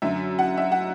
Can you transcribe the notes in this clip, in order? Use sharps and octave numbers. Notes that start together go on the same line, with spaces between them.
F#2 D3 F#3 E5
F#5
E5
F#5